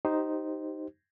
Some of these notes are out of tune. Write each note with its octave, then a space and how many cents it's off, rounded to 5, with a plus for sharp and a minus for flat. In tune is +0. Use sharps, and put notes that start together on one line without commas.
D#4 +0 G4 -20 C5 +0